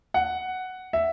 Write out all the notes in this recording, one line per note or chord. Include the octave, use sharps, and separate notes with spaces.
F#5
E5